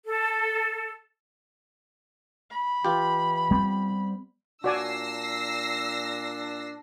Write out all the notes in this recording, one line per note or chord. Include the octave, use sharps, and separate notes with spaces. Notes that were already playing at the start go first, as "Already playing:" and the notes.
A4
B5
E3 F4 G4
G3 B3 C4
A#2 D4 F#4 D5 G#5 E6 A#6 C7